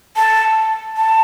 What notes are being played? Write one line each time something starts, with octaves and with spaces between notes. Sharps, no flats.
A5
A5